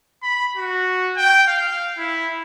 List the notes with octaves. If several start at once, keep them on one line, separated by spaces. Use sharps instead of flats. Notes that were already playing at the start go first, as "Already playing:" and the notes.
B5
F#4
G5
F5
E4